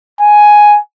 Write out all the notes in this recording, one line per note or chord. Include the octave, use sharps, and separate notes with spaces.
G#5